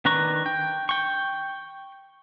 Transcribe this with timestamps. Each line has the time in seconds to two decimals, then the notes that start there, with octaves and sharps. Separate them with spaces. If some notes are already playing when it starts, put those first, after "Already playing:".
0.05 D#3 D4 B4 A#5 C#6
0.46 G5
0.89 G5 C#6